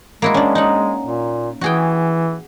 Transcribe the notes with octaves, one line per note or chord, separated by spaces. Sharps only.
G#3 A#3 E4 F#4
C#4 D4
D#4 F#5
A#2
E3 F#4 G#4 G5